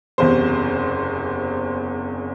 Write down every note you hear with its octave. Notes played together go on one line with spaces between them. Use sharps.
F#1 E2 C3 C5